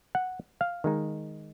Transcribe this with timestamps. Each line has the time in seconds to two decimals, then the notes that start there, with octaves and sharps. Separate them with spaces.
0.15 F#5
0.61 F5
0.84 D#3 G#3 D#4